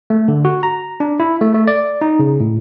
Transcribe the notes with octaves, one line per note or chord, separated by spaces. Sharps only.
A3
D3
F#4
A#5
D4
E4
A3
A3
D5
D#4
C#3
A2